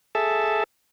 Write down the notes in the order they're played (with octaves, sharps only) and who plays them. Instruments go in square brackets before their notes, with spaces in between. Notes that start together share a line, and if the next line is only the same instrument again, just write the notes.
[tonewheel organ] G#4 A4 E5 A5